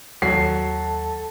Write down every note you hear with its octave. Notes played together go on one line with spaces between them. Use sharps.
D#2 F#3 A4 C7